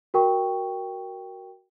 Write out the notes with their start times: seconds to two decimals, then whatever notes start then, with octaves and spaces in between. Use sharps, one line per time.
0.14 F#4 A#4 G5 C#6